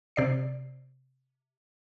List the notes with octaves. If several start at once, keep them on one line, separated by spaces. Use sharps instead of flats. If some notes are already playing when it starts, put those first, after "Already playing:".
C3 D5 C7